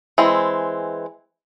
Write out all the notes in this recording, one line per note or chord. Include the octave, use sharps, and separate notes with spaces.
E3 G#3 C4